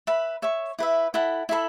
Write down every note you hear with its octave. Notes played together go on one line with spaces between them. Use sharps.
B4 E5 B5
C#5 E5 C#6
E4 B4 E5
E4 A4 F#5 B5
E4 A4 E5 B5